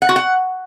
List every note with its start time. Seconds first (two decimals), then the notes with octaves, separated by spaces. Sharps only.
0.02 F#5
0.09 F#4
0.16 F#5